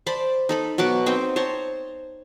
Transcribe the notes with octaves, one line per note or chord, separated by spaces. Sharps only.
C5 D5 A5 B5
D#4 A4 B5
B2 F#3 F#5 D6
C4 D#4 C5 G5
C5 C#5 A5 A#5